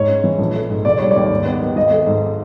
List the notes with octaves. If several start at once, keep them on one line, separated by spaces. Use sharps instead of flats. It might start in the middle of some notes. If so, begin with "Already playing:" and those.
Already playing: G#2 C#5
C#4
E3
A#1
A3
G#2
F1 D5
G3 C#5
D#2 D5
G#2
B3
D#3
G#1 D#5
A3
G#2